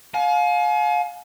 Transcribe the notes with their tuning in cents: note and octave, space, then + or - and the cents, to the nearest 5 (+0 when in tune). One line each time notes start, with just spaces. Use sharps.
F5 +30 G#5 +40